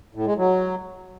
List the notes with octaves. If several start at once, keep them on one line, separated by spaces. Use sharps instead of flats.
A2
G#3
F#3